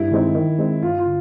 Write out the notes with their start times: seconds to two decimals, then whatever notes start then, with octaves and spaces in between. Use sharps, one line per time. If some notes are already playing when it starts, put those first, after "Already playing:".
Already playing: G2 E4
0.11 D#3 G#3 C4 D#4
0.35 D#3
0.59 G#3 C4 D#4
0.82 G2 F4
0.98 F4
1.06 D3